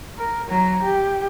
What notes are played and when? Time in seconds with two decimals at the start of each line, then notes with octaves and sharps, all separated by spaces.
0.18 A#4
0.49 F#3 A#5
0.83 G4